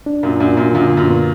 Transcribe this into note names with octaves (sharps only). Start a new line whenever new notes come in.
D4
F#2 A#2
F#2 A#2 D4
F#2 A#2
F#2 A#2 D3
F#2 A#2
B3